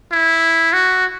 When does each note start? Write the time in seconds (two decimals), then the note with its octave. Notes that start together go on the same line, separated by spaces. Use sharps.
0.12 E4
0.73 F#4